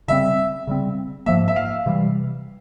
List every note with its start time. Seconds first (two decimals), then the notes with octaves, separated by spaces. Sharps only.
0.08 C#3 G3 C4 E5
0.67 C#3 G3 C4
1.26 G#2 F3 A#3 E5
1.48 E5
1.56 F5
1.86 C3 E3 G3